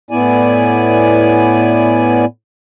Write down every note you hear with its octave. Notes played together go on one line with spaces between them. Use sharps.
A2 B3 E4 D5 G#5